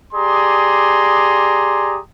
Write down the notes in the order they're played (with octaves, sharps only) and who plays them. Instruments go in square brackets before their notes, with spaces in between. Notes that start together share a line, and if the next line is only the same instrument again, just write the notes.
[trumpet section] G4 G#4 D5 A#5 C6 D#6